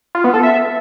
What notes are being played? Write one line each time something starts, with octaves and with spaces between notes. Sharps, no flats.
F4
B3
A4
E5